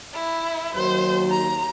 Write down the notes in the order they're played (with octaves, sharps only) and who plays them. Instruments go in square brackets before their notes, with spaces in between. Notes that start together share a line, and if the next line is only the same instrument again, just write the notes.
[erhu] E4
[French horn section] D#2 F#3 [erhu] C5
[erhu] A#5